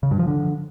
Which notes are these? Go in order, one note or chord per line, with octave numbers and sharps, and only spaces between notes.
C#3
G2
F3
D3